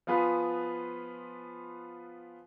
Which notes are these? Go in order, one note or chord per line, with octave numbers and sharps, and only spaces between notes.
F3 B3 F4 G#4 B4